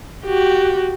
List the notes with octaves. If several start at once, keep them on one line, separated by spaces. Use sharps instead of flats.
F#4 G4